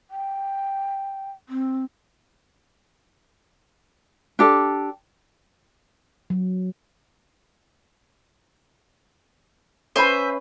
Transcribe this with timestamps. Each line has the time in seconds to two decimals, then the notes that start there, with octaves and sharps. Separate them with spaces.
0.11 G5
1.49 C4
4.39 D4 G4 A4
6.30 F#3
9.96 C#4 B4 C5 E5 G#5